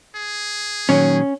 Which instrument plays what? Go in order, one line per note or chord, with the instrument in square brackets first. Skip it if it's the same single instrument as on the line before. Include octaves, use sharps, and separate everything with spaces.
[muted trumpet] G#4
[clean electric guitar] A#2 D#3 F#3 [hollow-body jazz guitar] C#4